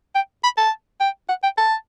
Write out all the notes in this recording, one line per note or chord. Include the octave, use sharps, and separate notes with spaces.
G5
B5
A5
G5
F#5
G5
A5